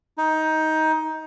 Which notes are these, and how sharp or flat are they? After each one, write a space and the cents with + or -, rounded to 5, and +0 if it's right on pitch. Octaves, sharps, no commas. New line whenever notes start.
D#4 +15